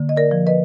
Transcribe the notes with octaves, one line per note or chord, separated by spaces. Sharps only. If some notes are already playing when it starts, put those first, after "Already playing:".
Already playing: D3 A#3
D#5
A#4 D5
F3
B4 D#5